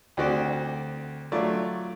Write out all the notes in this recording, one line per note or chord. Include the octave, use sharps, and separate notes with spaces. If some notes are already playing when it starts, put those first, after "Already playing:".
D2 C4 F#4 D5 G5
F#3 A3 F4 D5